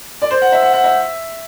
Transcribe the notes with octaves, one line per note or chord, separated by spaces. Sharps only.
D5
C5
F#5
E5
F#5
F#5
E5